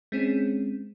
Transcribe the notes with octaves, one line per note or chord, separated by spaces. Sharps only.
G#3 C4 C#4